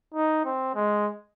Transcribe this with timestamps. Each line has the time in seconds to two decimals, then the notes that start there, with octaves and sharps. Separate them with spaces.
0.14 D#4
0.45 C4
0.75 G#3